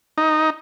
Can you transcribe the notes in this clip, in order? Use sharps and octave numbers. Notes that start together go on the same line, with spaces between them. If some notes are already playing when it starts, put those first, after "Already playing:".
D#4